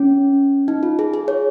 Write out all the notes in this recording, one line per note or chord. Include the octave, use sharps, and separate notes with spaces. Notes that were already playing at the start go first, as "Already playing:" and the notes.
Already playing: C#4
D#4
F4
G#4
G#4
C#5